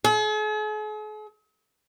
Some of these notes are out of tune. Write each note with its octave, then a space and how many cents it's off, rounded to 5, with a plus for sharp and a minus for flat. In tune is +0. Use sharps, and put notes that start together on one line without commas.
G#4 +45